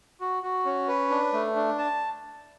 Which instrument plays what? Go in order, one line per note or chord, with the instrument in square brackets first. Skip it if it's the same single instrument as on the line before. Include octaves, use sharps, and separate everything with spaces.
[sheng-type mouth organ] F#4
F#4
C#4
B4
D4
A3
D4
A5